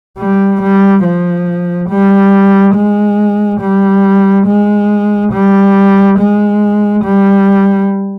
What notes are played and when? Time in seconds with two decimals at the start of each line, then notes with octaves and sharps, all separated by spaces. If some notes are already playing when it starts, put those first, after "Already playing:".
0.19 G3
0.62 G3
1.04 F3
1.89 G3
2.75 G#3
3.61 G3
4.46 G#3
5.32 G3
6.19 G#3
7.04 G3